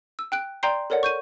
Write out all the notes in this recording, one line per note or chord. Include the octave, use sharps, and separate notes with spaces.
E6
G5 F#6 D7
D5 G5 A#5 C6 G6 C7
A4 A#4 C#5 D5 F#5
C#6 G6 D#7